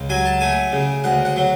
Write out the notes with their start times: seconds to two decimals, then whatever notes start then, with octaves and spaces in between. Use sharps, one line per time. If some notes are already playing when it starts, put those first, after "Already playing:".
Already playing: C#2
0.10 F#3 G#5
0.25 A5
0.41 A3 G#5
0.73 C#3
1.04 D2 F#5
1.25 F#5
1.36 F#3